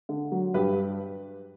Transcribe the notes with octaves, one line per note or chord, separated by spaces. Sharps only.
D3
F#3
G2 G4 B4